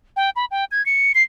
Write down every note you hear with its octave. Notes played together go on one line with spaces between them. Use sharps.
G5
B5
G5
G#6
C#7
C7